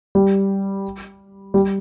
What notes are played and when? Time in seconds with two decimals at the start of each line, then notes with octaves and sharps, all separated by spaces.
0.15 G3
1.54 G3